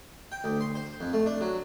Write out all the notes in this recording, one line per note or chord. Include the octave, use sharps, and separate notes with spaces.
G5
D2
C6
C5
F2
A3
D4
F#3